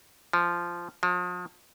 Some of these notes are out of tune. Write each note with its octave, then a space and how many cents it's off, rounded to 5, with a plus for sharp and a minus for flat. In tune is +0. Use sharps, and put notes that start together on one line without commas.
F3 -10
F3 +40